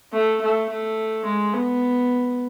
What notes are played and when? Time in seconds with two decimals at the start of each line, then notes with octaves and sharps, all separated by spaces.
0.13 A3
0.42 A3
0.70 A3
1.25 G#3
1.53 B3